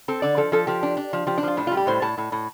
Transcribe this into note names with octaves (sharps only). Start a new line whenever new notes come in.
C4 A4
D3 D5
F3 A4
F3 A4
F3 G4
D4
D4
F3
F3 G4
D4
F3 F4
A2 D4
F4
G3
G4
A2 C5
A2 A5
A2
A2